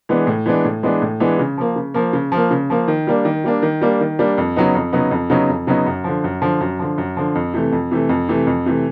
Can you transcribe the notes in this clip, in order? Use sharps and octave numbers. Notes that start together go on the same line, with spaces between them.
E3 G#3 B3 D4
A2
E3 G#3 B3 D4
A2
E3 G#3 B3 D4
A2
E3 G#3 B3 D4
C#3
F3 A#3
C#3
F3 A#3
C#3
F3
A#3
C#3
F3 A#3
D#3
G3 A#3 D4
D#3
G3 A#3 D4
D#3
G3 A#3 D4
D#3
G3 A#3 D4
F2
C#3 F#3 B3 D#4
F2
C#3 F#3 B3 D#4
F2
C#3 F#3 B3 D#4
F2
C#3 F#3 B3 D#4
F#2
D3 F3
F#2
D3 F3
F#2
D3 F3
F#2
D3 F3
F2
C3 E3 A3
F2
C3 E3 A3
F2
C3 E3 A3
F2
C3 E3 A3